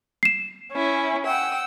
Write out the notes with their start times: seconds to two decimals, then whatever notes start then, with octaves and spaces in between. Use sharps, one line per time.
0.23 C7 E7
0.73 C#4 E4
1.25 F#5 G5 E6